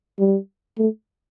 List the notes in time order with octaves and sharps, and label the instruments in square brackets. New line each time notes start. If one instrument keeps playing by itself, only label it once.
[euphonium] G3
A3